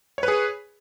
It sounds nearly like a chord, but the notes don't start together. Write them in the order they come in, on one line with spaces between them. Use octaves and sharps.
C#5 B4 G#4